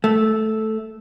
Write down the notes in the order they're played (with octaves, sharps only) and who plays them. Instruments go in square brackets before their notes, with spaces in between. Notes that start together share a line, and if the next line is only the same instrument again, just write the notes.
[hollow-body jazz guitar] A3